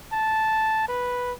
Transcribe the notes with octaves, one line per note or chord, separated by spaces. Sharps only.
A5
B4